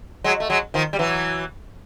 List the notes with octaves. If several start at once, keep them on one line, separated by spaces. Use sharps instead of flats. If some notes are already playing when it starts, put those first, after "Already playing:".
F#3 G#3
A3
F#3 G#3
D#3 F3
G3
E3 F#3